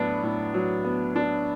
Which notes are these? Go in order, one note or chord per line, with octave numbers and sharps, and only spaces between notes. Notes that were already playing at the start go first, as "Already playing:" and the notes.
Already playing: A2 F#3 B3 D4
A2
F#3
B3
D4